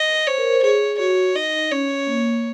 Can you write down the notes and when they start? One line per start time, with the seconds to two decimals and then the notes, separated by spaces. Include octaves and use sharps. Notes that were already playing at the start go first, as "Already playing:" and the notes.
Already playing: D#5
0.27 C5 C#5
0.38 A#4
0.50 C5
0.63 G#4 C#5
0.99 F#4 C#5
1.35 D#4 D#5
1.71 C#4 C#5
2.07 A#3